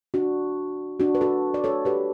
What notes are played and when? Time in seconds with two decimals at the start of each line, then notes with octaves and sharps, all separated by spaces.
0.14 D4 F#4
1.00 D4 F#4
1.15 B4
1.21 F#4 A4
1.54 D5
1.64 A4 C#5
1.85 G4 B4